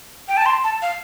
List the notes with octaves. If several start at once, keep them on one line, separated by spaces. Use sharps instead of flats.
G5
A5
C6
A5
F5